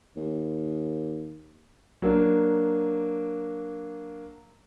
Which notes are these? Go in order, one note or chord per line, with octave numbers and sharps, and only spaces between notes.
D#2
F#3 A#3 D4